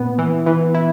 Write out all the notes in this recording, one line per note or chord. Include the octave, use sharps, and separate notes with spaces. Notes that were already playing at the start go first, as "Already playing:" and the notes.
Already playing: A#2 B3
E3
E3
E4